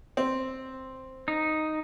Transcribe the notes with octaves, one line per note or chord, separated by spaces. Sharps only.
C4
D#4